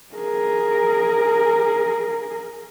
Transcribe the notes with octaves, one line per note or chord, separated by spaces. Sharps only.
G#4 A#4